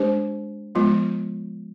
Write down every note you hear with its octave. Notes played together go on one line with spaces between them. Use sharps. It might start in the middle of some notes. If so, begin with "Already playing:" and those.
Already playing: G#3 D4 G4 C5
F3 G#3 B3 F4